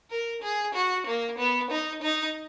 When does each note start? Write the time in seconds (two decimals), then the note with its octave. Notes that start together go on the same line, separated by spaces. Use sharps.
0.10 A#4
0.42 G#4
0.74 F#4
1.07 A#3
1.38 B3
1.70 D#4
2.02 D#4